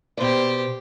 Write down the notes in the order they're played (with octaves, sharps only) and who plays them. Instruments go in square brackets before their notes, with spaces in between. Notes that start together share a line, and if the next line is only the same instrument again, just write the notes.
[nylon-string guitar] B2 D5 [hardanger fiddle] G4 C5